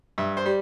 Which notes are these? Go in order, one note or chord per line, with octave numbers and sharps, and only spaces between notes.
G2 E5
C5
G3